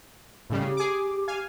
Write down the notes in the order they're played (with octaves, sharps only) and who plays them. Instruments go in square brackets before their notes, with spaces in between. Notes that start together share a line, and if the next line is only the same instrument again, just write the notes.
[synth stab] A2 C#3 G3
[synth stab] C#3 [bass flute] G4
[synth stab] G#4 D6
F5 G#5